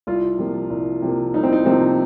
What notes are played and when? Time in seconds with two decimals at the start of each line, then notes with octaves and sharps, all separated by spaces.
0.07 C2 F4
0.38 C3 F3 A#3
0.70 C2
1.02 C3 F3 A#3
1.34 C2 D#4
1.43 C4
1.53 D#4
1.65 C3 F3 A#3 C4